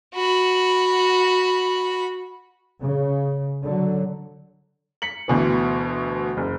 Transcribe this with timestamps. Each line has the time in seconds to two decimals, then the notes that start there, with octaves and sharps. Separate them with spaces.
0.14 F#4 B5
2.82 C#3
3.62 D3 F#3
5.02 B6 C#7 F#7
5.28 D2 B2 E3
6.37 F#1